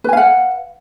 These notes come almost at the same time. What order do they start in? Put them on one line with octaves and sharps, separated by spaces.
B4 G#5 F5 F#5